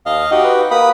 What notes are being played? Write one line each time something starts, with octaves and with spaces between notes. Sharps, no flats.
D#2 D#5 F5
D#4 F#4 G4
B4
A#3 B4 B5 D#6